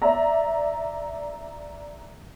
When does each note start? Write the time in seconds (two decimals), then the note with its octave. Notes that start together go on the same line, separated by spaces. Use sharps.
0.02 D5 E5 A#5